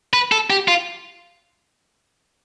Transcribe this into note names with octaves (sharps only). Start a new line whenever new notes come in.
B4
A4
G4
F4